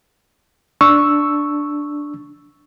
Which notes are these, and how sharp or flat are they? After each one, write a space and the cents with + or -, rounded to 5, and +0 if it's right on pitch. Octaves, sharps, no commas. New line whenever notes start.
D4 +0 C#6 +0 E6 +0